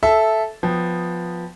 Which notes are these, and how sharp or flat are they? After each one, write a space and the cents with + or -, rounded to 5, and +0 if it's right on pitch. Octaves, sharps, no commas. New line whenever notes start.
A4 -10 E5 +0
F3 +10 B3 +0 G5 +0